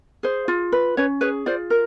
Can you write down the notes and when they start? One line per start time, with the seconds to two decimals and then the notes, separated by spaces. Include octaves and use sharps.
0.23 G#4 C5
0.48 F4
0.72 B4
0.97 C#4 B4 C#5
1.21 G#4 B4 C#5
1.46 F4 C5 D5
1.70 A#4